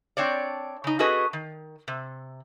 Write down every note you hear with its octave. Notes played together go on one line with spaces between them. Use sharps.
C4 D4 C#5 D5
C#3 D#4
C#4 F#4 G#4 A4 B4 D#5
D#3
C3